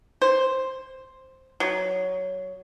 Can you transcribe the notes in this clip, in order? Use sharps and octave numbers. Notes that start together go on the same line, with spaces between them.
C5
F#3